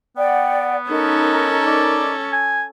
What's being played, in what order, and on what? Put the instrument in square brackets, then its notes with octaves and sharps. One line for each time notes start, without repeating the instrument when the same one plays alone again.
[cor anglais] B3 [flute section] D5 F#5 G5
[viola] C#4 A4 [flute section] D#4 A#4
[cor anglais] D5
G#5